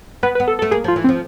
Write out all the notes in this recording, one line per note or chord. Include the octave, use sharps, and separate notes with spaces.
B3 B4
B4
B3
A4
A4
A3
A#3 G#4
F3 F4
E3
C4
F3